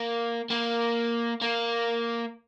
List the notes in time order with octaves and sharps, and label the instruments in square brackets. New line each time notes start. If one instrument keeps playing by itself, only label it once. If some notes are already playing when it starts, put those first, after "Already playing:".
Already playing: [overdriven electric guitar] A#3
A#3
A#3